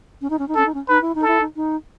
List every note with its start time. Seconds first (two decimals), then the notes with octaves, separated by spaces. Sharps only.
0.22 C#4
0.30 D#4
0.39 C#4
0.48 D#4
0.55 C#4 A4
0.66 D#4
0.74 C#4
0.89 D#4 B4
1.02 E4
1.15 D#4
1.22 A4
1.28 E4
1.41 D#4
1.56 D#4